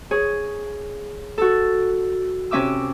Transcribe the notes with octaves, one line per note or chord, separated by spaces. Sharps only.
G#4 C#5
F#4 A4
C3 C#4 E5 D6 E6